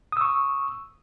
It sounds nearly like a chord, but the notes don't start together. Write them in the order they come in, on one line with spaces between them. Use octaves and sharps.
D#6 E6 C#6